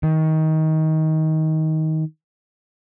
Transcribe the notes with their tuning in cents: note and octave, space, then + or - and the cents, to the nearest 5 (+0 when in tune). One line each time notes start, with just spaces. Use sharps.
D#3 +20